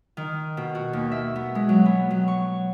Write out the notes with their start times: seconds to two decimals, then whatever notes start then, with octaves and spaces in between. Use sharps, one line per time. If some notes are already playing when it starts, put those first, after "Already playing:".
0.17 D#3
0.57 B2
0.75 F#4
0.93 D#2
1.12 E5
1.36 B3
1.55 G#3
1.69 F#3
1.85 B3
2.11 F#3
2.28 C#6